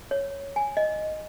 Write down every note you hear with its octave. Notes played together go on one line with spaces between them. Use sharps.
C#5
G#5
D#5